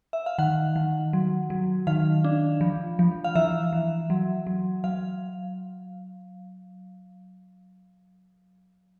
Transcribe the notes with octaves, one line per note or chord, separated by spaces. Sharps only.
E5
F5
D#3 F#5
D#3
F#3
F#3
D#3 F5
D4
F3
F3
F5
E3 E5
E3
F#3
F#3
F#3 F5